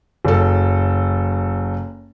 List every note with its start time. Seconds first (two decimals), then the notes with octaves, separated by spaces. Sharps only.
0.25 F#1 F#2 A4